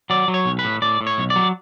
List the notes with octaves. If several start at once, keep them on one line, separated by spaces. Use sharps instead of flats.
F#3 D5
F#3
C#5
B1
B4
A2
A2 D5
A2
C#5
B1
D5
F#3